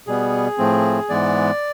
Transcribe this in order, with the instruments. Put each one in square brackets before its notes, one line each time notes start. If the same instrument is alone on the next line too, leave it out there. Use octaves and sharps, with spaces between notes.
[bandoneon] B2 G3 B3 G#4
A2 F3 A3 C4
G#2 E3 G#3 B3 D5